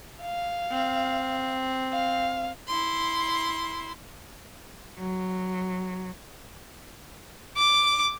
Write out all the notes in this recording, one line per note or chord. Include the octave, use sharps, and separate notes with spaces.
F5
C4
F5
E4 C6
F#3
D6